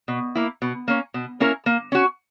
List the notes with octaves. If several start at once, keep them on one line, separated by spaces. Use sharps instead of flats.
B2
A#3 E4
B2
A#3 C#4
B2
A#3 C#4 E4 A#4
A#3
C#4 F#4